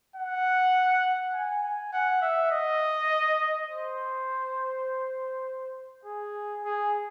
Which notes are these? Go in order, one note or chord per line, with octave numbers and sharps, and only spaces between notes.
F#5
G#5
G#5
F#5
E5
D#5
C5
G#4
G#4